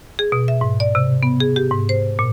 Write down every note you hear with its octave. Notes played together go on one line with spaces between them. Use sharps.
G#4
B2
E5
G#2
D5
C3
B3
G#4
G4
G#2
C5
A#2